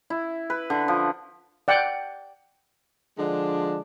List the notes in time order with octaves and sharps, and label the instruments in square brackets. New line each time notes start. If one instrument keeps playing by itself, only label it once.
[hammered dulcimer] E4
B4
D3
F3
[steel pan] D5 F#5 G5
[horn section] D3 F3 G#3 D4